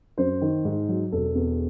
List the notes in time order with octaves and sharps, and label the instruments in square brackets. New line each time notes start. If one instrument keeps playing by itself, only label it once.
[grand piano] F#2 C5
D#3
G#2
F#3
E1 A4
E2